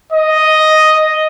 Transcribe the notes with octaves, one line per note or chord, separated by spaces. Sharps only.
D#5